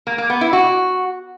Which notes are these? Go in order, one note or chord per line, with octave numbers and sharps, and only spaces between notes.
A#3
A#3
B3
E4
F#4